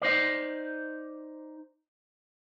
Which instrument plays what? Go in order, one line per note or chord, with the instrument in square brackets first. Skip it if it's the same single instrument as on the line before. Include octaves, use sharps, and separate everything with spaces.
[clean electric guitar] D#4 C5 D5